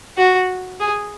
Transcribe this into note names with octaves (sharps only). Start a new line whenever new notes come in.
F#4
G#4